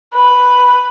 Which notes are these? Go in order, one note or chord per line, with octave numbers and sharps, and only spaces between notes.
B4